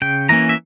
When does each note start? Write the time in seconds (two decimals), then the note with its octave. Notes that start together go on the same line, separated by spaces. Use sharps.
0.02 C#3 G5
0.29 E3 A#3 C#4 A#5
0.49 E5